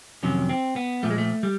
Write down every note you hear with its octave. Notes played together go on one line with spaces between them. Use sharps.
F2 C3 D#3 F#3 C#4
C4
B3
A#2 F3 A3
G#3
A3
G3